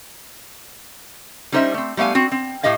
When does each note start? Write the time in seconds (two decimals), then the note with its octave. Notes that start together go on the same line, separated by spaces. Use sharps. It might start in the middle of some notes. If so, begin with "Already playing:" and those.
1.52 G3 C#4 D#4 C5 D#5 E5
1.74 A3 C4
1.97 G3 A3 B3 F5 G#5
2.15 C4 F#4
2.32 C4
2.63 A2 A3 G4 D#5 F5